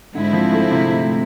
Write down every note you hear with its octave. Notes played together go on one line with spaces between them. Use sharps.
G#2 D3 G#3 C4 E4
F3
A3
C3